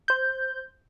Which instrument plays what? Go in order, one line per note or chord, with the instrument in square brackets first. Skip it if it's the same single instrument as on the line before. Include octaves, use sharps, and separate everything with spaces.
[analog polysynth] C5 G6